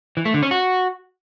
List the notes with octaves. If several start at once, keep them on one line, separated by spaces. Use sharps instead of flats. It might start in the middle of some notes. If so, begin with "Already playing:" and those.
E3
A3
D3
C#4
F#4